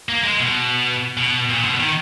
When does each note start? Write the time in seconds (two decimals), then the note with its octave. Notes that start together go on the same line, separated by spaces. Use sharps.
0.09 A#3
0.24 G#3
0.40 B2
1.17 B2
1.49 A#2
1.65 B2
1.79 D#3